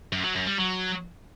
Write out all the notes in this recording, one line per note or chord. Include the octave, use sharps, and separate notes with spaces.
F#2
F#3
F#2
G3
F#3